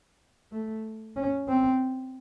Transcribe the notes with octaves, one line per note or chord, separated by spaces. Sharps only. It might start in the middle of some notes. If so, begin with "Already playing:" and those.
A3
C#4
C4